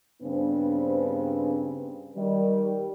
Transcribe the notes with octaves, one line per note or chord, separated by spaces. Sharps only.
G2 C#3 B3 C4 D4
D#3 G3